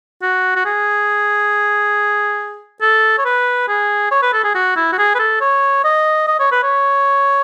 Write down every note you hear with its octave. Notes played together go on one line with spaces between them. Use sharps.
F#4
F#4
G#4
A4
C#5
B4
G#4
C#5
B4
A4
G#4
F#4
E4
F#4
G#4
B4
A4
C#5
D#5
D#5
C#5
B4
C#5